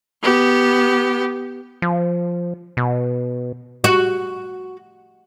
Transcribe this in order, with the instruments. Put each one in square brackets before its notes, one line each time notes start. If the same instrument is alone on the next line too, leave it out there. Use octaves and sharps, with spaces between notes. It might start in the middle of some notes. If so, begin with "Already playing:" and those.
[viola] B3 G4
[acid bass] F3
B2
[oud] F#4